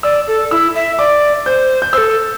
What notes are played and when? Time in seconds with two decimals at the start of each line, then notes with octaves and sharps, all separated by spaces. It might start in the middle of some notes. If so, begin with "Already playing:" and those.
0.03 D5 E6
0.28 A4
0.51 E4 E6
0.75 E5
0.99 D5 D6
1.46 C5 G6
1.82 G6
1.93 C5 E6
1.98 A4